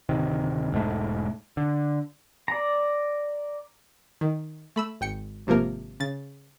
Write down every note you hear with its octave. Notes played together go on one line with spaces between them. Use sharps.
D1 C3 D#3
E1 G#2 C#3 A3
D3
D5 A#5
D#3
A3 B5 E6
G#1 G5 C#7
G#1 C3 F3 A#3 A#4
C#3 A6